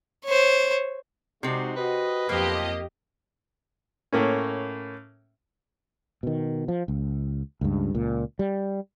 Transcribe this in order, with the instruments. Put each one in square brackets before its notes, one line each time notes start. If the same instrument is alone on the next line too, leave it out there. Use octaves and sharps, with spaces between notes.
[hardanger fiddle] C5 C#5
[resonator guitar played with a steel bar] C3 C4 [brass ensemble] G#3 D#4 F#4
[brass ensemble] F#4 D#5 [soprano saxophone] B4
[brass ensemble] B1 F3 [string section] F2 G4 D#5 [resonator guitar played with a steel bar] A#3
[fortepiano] A2 A#3 C#4
[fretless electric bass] B2 D#3
F3
C#2
C#2 G2
C#2 A#2
G3